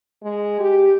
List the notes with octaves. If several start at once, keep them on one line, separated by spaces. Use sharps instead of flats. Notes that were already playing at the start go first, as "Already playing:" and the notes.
G#3
G4